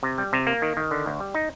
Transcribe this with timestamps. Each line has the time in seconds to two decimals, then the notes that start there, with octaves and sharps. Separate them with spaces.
0.03 C3
0.18 G3
0.33 C3
0.47 A#3
0.62 D#3
0.77 D#3
0.91 D3
1.06 D2
1.20 G3
1.35 D#4